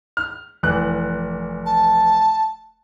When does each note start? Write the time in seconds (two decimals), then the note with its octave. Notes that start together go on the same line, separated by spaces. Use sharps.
0.17 F6
0.63 F1 E3 F#6
1.66 A5